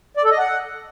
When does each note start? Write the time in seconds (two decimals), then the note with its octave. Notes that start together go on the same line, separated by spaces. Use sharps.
0.17 D5
0.24 A4
0.31 D#5
0.38 F#5